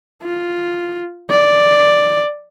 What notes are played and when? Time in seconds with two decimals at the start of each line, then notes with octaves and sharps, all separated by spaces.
0.23 F4
1.30 D5